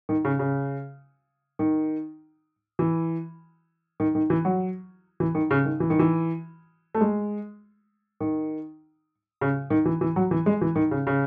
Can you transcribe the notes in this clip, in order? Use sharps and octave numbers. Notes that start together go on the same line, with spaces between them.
D#3
C#3
C#3
D#3
E3
D#3
D#3
E3
F#3
E3
D#3
C#3
D#3
E3
D#3
E3
A3
G#3
D#3
C#3
D#3
E3
E3
F#3
E3
G#3
E3
D#3
C#3
C#3